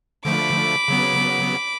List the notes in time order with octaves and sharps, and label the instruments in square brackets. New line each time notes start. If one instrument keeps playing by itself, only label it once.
[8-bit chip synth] D3 F3 A3 [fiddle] B5 D6
[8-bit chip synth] C#3 F#3 B3